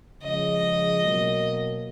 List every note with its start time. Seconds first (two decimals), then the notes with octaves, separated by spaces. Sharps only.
0.22 C#3 F3 G#3 D#5
1.02 B2 F#3 A#3